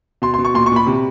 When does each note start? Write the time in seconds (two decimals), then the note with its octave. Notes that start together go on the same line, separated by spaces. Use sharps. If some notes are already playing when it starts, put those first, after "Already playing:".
0.22 B2 C6
0.34 C6
0.38 B2
0.45 C#6
0.54 A#2 C6
0.66 C#6
0.72 A#2 B5
0.87 C3